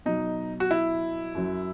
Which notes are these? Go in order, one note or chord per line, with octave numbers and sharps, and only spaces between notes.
B2 F#3 D#4
F#4
E4
F#2 F#3